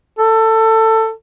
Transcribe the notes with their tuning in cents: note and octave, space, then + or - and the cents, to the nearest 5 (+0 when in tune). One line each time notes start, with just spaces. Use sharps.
A4 +20